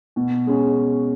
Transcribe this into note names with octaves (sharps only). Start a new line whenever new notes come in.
B2
G#3 C#4 G#4